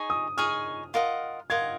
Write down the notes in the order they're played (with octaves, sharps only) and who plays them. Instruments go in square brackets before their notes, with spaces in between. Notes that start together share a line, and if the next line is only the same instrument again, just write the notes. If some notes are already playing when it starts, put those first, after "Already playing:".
Already playing: [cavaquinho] D#4 G#4 C#5 G#5
[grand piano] D#6
[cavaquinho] D#4 G#4 C#5 G#5 [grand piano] F6
[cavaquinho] F4 A#4 D#5 F#5
[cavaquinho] F4 A#4 D#5 F#5 [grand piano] G#6